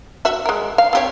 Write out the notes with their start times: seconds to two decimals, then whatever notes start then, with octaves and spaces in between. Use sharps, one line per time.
0.25 F#4 E5
0.46 G#3 A#4
0.78 F5
0.93 C4 G4 C#5